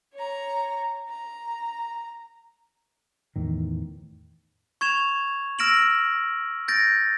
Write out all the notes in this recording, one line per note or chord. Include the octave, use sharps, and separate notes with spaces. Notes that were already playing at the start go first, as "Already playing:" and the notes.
C#5 A#5
A#5
E2 A2 D#3
C#6 G#6 E7 F7
E6 F6 A#6 D7 E7 F#7
G6 A6 A#6 D7